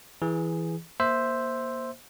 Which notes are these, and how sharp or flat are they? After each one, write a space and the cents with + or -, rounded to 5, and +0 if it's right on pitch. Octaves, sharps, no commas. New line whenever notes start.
E3 +0 G#4 +0
A#3 +15 C5 +0 E5 +0